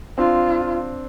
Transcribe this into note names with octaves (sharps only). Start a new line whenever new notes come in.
C4 D4 F4